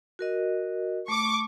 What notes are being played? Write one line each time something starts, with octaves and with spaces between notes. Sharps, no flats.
F#4 A#4 D#5
A3 C#6 D6